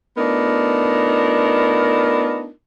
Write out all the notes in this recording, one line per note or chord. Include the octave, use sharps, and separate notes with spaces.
A3 B3 D4 D#4 F4 A#4